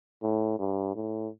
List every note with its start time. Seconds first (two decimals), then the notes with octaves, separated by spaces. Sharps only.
0.23 A2
0.59 G2
0.96 A2